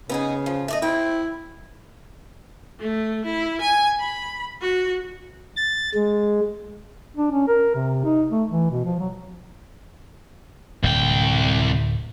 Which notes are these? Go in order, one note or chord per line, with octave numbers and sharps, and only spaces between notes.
C#3 B3 D#4 G#4
F3
A3 D5 D#5
E4 C5 G5
A3
E4
G#5
B5
F#4
A6
G#3
D4
C#4
A#4
C3
D#4
A3
E3
B2
F3
F#3
D1 C2 G5